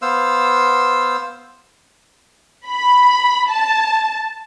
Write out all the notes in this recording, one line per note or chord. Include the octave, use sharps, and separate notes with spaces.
B3 C5 F5 E6
B5
A5